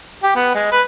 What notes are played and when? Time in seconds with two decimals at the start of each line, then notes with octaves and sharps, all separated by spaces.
0.23 G4
0.35 B3
0.55 G#3
0.72 B4